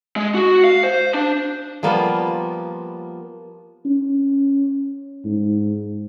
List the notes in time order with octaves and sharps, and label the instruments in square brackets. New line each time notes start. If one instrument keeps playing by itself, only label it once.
[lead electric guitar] G#3
F#4
F5
C5
D4
[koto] F3 G3 A#3 B3 F4
[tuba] C#4
G#2